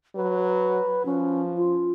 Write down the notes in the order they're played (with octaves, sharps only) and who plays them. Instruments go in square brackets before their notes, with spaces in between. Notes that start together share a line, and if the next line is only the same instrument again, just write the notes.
[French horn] F#3 [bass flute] B4
[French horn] F3 [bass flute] C#4
[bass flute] F4